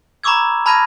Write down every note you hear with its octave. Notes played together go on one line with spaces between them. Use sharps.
A#5 B5 C#6 D6 E6 G#6
A5 B5 F6 G#6 A#6 D#7